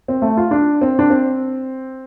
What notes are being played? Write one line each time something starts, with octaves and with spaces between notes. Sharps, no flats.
C4
A3
F4
D4
C4
D4
C4